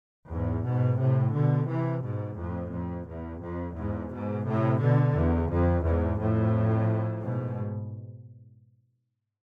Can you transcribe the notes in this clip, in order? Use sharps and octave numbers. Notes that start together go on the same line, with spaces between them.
E2 G#2
G#2 B2
A2 C3
B2 D3
C3 E3
G#2 B2
F2 A2
F2
E2
F2
E2 G#2
G#2 B2
A2 C3
B2 D3
E2
F2
E2 G#2
F2 A2
G#2 B2